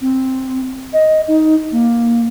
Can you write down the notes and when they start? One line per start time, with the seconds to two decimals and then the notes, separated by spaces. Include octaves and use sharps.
0.01 C4
0.93 D#5
1.28 D#4
1.72 A#3